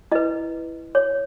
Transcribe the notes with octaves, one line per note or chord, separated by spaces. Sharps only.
E4 B4 D#5
C#5